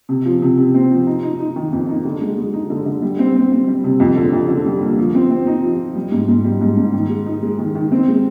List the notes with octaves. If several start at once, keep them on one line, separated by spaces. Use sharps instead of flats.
C3
F3
C3
C3
C4
F3
D#4
D#4
D#4
D#3
F2
D#4
D3
G#3
G#3
D#4
D3
D3
G3
C4
C4
C4
G3
C3
F2
D3
F2
D3
G3
A#3
F3
C4
C4
D#4
F3
F3
G3
G#2
G#2
G3
G#2
G#2
D#3
G#3
D#4
G#3
D#3
D#3
C4
G#3